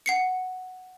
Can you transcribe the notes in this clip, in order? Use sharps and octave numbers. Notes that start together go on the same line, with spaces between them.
F#5 C7 C#7